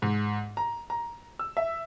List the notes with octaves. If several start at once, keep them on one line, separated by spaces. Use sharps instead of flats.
G#2
A#5
A#5
E6
E5